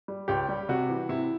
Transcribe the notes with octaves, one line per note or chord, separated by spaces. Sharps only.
G3
C#2 G4
G3
C3 F#4
E3
C3 E4